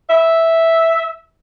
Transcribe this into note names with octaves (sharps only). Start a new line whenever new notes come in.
E5